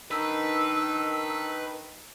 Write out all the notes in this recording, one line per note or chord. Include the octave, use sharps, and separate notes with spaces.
D#3 D4 D#4 B4 E6